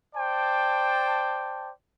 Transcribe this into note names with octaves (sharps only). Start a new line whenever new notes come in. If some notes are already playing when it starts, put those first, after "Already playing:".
C5 D5 G5 A5